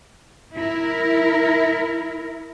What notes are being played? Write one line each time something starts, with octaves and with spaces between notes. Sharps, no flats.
E4 A#4